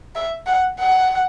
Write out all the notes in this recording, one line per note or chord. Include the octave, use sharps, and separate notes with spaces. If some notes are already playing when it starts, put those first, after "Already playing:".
E5
F#5
F#5